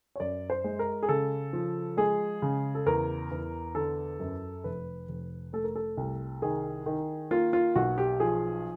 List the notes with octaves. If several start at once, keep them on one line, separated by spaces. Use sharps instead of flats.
C#5
F#2 D5
C5
G#3
A#4
G#4
C#3 A4
F3
G#3 G#4
C#3
A4
E2 A#4
E2
D3 A4
F#2
F1 B4
F1
A3 A4
A#4
A4
C2
D#3 G#4
D#3
A#3 F4
F4
B1 F#4
G4
F3 G#4